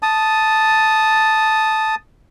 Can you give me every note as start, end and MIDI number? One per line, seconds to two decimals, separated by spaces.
0.03 1.95 81
0.03 1.95 87